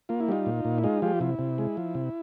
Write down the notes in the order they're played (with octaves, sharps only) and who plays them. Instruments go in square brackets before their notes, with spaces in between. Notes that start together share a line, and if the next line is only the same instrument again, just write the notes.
[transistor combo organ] A#3 F4
E4
G3 D#4 F4
A#2
A#2
E4
G#3 D#4 F4
F3 F4 G4
C3 E4
C3
G#3
F3
C3